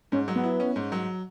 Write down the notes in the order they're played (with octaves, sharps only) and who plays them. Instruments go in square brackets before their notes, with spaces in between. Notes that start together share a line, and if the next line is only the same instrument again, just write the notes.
[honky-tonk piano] G#2 [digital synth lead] C#4
[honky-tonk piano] F#3
[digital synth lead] B3
[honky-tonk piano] E4
C#4
G#2
F#3